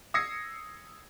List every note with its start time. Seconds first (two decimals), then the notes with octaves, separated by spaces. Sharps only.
0.14 D#6 E6 G#6 A#6 C7 C#7